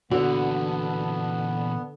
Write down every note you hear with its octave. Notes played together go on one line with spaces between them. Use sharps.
A#2 D3 E3 B3 F#4